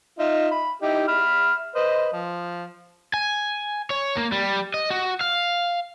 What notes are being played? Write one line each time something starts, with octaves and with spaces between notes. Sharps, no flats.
D#4 F4 E5
B5
D#4 E4 G4
E5 B5 F6
B4 C5 D#5
F3
G#5
C#5
A#3
G3
D#5
F#4
F5